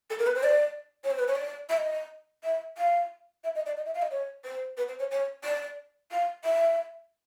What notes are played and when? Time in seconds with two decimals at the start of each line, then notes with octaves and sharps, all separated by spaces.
0.10 A4
0.19 A#4
0.27 B4
0.35 C5
0.43 D5
1.04 C#5
1.11 C5
1.19 B4
1.28 C#5
1.36 D5
1.70 E5
1.77 D#5
2.44 E5
2.77 F5
3.44 E5
3.55 D#5
3.66 D5
3.77 D#5
3.85 E5
3.94 F5
4.02 D#5
4.11 C#5
4.44 C5
4.77 B4
4.88 C5
4.99 C#5
5.11 C#5
5.44 D5
6.11 F5
6.44 E5